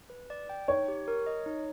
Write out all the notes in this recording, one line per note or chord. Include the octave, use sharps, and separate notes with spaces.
B4
D5
G5
D#4 C#5
G4
A#4
D#5
D#4